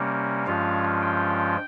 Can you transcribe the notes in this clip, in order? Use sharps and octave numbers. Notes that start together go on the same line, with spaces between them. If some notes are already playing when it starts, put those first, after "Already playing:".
Already playing: C3 G3 A#3 C#4
G2 F3 G#3 C#4 F4 F5
G5